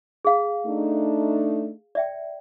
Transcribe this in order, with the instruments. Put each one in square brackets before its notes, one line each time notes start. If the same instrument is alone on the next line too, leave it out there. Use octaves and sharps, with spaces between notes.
[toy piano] G#4 F5
[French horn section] A3 D4 D#4
[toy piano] D5 E5 G5